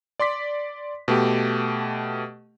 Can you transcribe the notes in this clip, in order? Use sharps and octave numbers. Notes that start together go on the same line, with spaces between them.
D5 C6 D6 B6
B2 A3 G4